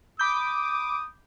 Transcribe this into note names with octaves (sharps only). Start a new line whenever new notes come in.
B5 D6 D#6 G6